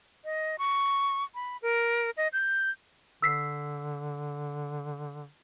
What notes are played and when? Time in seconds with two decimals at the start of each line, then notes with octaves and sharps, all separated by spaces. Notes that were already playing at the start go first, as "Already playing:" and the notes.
0.25 D#5
0.58 C#6
1.35 B5
1.62 A#4
2.17 D#5
2.33 G6
3.22 D3 E6 B6 C7